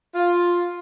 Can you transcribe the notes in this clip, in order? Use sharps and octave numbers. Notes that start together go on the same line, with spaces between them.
F4